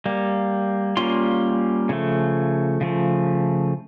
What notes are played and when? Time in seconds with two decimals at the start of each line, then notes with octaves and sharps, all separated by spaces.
0.06 G3 A#3
0.97 G3 A#3 C#4 F4 C6
1.89 C#3 F3 A3
2.81 C#3 F3 A3